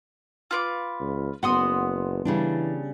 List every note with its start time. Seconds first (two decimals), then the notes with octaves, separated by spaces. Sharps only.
0.51 F4 B4 D6
1.00 C#2
1.43 F#1 B3 F#4 F#5 C6 D#6
2.25 C#3 E3 G3 D4